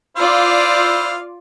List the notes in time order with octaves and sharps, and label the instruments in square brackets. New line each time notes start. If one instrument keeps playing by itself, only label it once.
[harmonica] E4 C5 F5 [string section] F4 D5